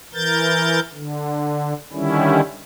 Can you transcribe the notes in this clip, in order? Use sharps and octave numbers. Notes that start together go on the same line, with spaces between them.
E3 A#4 G6 A6
D3
D3 D#3 G3 C#4 E4